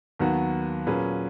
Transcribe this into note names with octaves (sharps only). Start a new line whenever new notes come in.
D#2 D#3 F#3 B3 F#4
A#2 F#3 C#4 G#4 B4